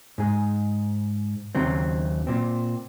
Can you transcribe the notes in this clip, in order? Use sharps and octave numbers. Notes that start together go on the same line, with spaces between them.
G#2 G#4
D#2 C#3 F#3 C4
A#2 C4